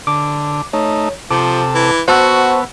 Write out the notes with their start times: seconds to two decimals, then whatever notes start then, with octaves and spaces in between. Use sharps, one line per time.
0.07 D3 D6
0.73 A3 D#4 C#5
1.31 C3 F3 A4 D6
1.75 E3
2.08 B3 F#4 C5 F#5 A5 C#6 E6